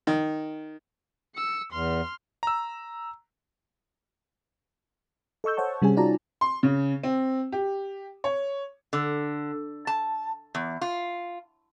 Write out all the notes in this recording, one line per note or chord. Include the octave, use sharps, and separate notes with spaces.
D#3
E6 C#7
E2 C6 F6
A#5 E6
A4 D#5 C#6 E6 G6
C5 C#5 F#5 A5 C#6
C3 G3 C#4 G#4 G#5
D#4 F4 F#4 D5 A5 A#5
C6
C#3
C4
G4
C#5
D3
A5
E2
F4